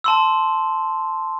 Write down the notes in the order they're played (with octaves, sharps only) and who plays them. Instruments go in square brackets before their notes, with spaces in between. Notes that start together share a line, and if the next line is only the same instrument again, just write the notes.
[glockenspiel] A5 C6 E6